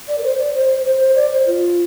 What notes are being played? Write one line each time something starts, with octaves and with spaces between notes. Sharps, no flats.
D5
A#4
C5
D5
C5
C5
C5
D5
C5
F4